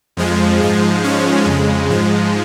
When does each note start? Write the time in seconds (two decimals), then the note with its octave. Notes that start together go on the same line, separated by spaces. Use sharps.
0.17 F2 F3 G#3
0.61 G#2 F3 G#3
1.04 G#2 F3 G#3 C#4
1.46 F2 C#3 G#3
1.90 G#2 F3 G#3